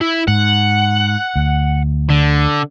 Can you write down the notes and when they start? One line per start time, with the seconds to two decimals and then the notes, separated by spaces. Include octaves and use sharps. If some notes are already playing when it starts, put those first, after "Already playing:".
0.01 E4
0.28 G#2 F#5
1.36 D2
2.10 D3